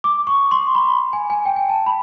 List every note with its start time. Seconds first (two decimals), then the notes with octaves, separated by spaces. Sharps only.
0.04 D6
0.27 C#6
0.51 C6
0.75 B5
1.13 G#5
1.30 G#5
1.46 G5
1.56 G#5
1.69 A5
1.86 B5